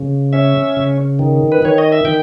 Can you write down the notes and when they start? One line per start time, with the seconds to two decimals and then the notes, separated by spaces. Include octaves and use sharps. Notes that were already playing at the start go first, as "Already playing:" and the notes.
Already playing: C#3
0.33 C#4 E5
0.77 C#3
1.19 D#3
1.52 B4
1.62 D#3 C#5
1.78 D#5
1.92 E5
2.05 D#3 G5